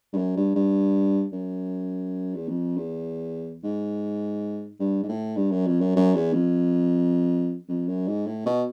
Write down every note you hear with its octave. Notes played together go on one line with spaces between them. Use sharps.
G2
F#2
G2
G2
F#2
E2
F2
E2
G#2
G2
G#2
A2
G2
F#2
F2
F#2
F#2
E2
F2
F2
F#2
G#2
A2
B2